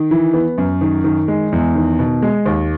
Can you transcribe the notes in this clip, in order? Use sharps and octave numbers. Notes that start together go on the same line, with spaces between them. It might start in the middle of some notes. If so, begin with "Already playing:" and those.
Already playing: D#3
E3
B3
F#2
D#3
D#3
G#3
E2
D#3
B2
G#3
D#2